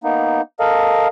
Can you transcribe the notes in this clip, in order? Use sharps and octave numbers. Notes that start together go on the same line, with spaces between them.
A#3 B3 D#4
A4 A#4 D#5 F5